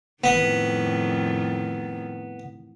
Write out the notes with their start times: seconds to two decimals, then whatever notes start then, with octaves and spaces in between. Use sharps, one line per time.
0.24 F2 A2 D#3 B3